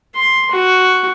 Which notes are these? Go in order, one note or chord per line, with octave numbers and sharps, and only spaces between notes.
C6
F#4